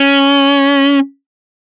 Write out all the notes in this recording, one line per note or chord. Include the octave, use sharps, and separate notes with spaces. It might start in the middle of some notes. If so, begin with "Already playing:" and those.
Already playing: C#4